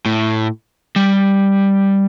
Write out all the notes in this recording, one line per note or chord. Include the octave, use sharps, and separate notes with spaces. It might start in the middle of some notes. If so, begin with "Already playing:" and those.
A2
G3